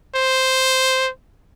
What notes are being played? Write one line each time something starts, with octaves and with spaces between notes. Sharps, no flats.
C5